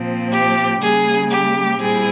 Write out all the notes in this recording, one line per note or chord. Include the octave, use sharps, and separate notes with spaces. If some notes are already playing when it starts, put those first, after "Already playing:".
Already playing: A#2 F3 C4
G4
C#3 G3 A#3 G#4
G4
A#2 G3 C4 E4 G#4